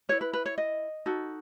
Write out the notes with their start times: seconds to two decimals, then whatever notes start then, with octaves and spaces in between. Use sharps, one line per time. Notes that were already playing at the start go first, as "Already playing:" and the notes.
0.09 E4 B4 C#5
0.21 B4
0.33 B4
0.46 C#5
0.58 D#5
1.06 D#4 F#4 A4